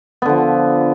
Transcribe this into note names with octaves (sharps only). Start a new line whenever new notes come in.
D3 F3 B3